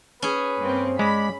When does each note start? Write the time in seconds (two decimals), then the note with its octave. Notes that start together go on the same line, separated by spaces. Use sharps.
0.22 C#4 G#4 B4
0.58 G2 A#3 C4
0.99 G#3 D5 B5